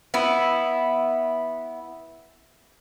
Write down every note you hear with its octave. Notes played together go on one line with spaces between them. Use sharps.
B3 E4